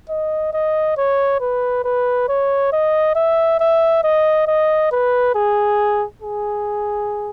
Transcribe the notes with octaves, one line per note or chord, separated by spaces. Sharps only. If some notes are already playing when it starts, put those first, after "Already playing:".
D#5
D#5
C#5
B4
B4
C#5
D#5
E5
E5
D#5
D#5
B4
G#4
G#4